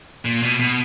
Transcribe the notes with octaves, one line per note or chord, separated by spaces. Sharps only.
A#2
B2
B2